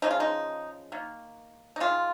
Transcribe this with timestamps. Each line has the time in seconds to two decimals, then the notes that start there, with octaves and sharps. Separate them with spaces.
0.02 C#3 F3 G#3 D#4
0.11 F4
0.20 D#4
0.92 D#3 A#3
1.76 D#4
1.80 D#3 G#3 F4